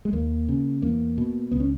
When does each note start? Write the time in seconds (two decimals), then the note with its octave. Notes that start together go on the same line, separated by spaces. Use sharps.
0.05 G#3
0.13 D#2 A#3
0.48 C#3
0.82 E2 A#3
1.18 B2
1.51 C#2 B3
1.60 C#4